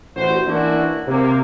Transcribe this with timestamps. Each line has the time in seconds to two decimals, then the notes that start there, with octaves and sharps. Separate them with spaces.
0.16 A1 F#4 C5
0.47 E3 A#3 C#4 D4 E4 F#4
1.07 C3 A#3